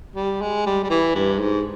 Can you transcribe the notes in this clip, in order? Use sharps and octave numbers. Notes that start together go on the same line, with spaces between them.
G3
G#3
G3
G3
E3
G2
G#2